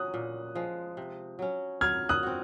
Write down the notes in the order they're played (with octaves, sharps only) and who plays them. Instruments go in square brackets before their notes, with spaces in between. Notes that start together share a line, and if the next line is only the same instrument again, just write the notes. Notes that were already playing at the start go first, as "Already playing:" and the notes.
Already playing: [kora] F#3 C#4 [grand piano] D#6 F#6
[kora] A#2
F3 G#3
C3
F#3 C#4
[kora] F#3 [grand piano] F6 G#6
[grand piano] D#6 F#6
[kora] C4 F#4